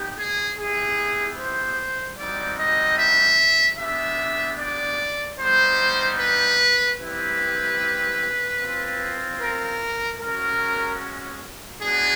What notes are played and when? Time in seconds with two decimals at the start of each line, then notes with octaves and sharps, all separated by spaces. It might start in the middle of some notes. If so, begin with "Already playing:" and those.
Already playing: B3 D#4 G4
0.18 G#4
0.58 B3 E4 G4 G#4
1.38 C5
2.18 G3 C4 D#4 F#4 D5
2.58 D#5
2.99 E5
3.79 B3 D4 G4 E5
4.59 D5
5.39 G3 B3 D#4 C5
6.20 B4
7.00 G3 C4 E4 G4 B4
8.60 C4 F4
9.41 A#4
10.21 G#3 C#4 F#4 A#4
11.81 G#3 B3 D4 F#4 G#4